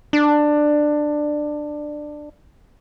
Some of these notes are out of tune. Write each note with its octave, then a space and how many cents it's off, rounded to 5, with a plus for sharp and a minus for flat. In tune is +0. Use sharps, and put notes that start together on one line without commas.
D4 +15